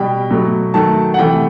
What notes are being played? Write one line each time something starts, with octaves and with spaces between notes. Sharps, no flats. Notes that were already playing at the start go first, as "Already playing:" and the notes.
Already playing: B2 G3 G5
B2 F#3 A3
D#3 F#3 A3 A5
F#5
C3 E3 A3 G5